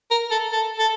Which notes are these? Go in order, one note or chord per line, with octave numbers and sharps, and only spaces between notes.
A#4
A4
A4
A4